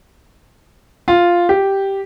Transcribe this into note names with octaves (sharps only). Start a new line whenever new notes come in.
F4
G4